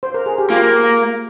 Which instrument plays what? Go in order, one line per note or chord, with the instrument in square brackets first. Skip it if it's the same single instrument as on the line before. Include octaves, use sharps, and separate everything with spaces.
[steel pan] C5
A#4
G#4
G4
[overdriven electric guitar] A#3 [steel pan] F4